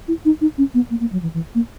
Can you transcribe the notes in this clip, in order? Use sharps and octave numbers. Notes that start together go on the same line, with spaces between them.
E4
D#4
D#4
C#4
B3
A#3
A#3
F#3
E3
E3
A#3